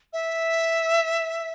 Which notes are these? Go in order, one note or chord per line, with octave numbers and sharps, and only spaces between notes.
E5